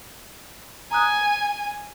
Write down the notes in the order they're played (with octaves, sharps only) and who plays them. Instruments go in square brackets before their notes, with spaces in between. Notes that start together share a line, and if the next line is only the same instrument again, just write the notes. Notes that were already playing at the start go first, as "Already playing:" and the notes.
[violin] G#5 [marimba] A#5 D#6 F#6